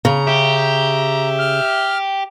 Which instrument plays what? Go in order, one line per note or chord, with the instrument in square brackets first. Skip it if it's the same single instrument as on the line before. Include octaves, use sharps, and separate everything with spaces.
[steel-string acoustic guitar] C#3 [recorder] A#5
[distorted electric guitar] G4 [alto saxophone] E5
[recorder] F6